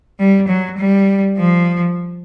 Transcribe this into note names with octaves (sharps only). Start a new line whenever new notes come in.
G3
F#3
G3
F3